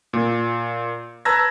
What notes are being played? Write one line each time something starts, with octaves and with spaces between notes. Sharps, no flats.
A#2
B4 A5 A#5 E6 G#6 A#6